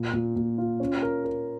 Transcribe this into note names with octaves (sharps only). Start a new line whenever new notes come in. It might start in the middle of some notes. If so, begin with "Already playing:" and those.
Already playing: A#2
A#2
A#2
F4
C#4
A#4
A#4